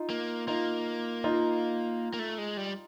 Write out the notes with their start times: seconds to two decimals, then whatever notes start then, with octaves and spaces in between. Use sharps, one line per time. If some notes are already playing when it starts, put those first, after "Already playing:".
Already playing: D#4 F4
0.10 A#3
0.47 A#3 D#4 F4
1.24 D#4 F4
2.13 A#3
2.19 A3
2.38 G#3
2.57 G3